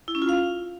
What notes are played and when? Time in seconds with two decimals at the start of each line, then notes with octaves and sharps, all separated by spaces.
0.08 E4
0.15 C#4
0.22 F4
0.29 F5